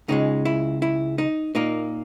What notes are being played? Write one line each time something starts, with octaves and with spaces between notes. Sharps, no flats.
C#2 C#3 G#3 D#4
E4
E4
D#4
A#2 A#3 D#4